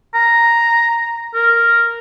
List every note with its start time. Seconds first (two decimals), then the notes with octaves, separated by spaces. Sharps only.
0.14 A#5
1.34 A#4